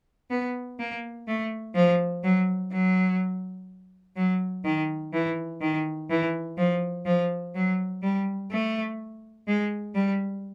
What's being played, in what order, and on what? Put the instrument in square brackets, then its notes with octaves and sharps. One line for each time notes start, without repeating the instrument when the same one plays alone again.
[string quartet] B3
A#3
A3
F3
F#3
F#3
F#3
D#3
E3
D#3
E3
F3
F3
F#3
G3
A3
G#3
G3